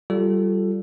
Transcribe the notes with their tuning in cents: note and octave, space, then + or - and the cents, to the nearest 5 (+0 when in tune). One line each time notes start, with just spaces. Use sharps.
G3 -20 F4 +0 A4 +0